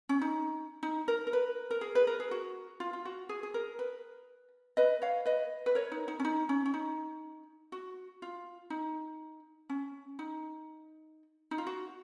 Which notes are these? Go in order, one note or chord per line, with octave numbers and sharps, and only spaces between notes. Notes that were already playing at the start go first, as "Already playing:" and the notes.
C#4
D#4
D#4
A#4
A#4
B4
A#4
G#4
B4
A#4
G#4
F#4
F4
F4
F#4
G#4
G#4
A#4
B4
B4 D#5
C#5 F5
B4 D#5
B4
A#4 C#5
D#4
D#4
C#4
D#4
C#4
C#4
D#4
F#4
F4
D#4
C#4
D#4
D#4
F4
F#4